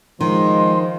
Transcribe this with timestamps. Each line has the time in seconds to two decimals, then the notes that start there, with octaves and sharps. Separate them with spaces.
0.21 D#3 F3 G#3 C6